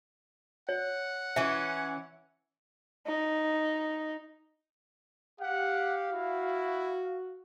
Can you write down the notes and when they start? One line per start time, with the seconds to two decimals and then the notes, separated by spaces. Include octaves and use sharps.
0.69 C#5 F#5
1.36 E3 C#4 E5
3.06 D#4
5.41 G4 F5 F#5
6.12 E4 F#4